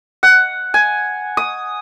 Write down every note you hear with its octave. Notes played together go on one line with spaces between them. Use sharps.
F#5
G#5
D#6